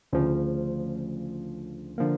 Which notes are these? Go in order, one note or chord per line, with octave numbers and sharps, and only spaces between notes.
D2 C#3 F3
D3 F3 A#3